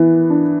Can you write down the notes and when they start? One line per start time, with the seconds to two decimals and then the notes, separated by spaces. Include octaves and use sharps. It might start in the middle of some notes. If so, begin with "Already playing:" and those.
Already playing: E3 B3
0.30 D4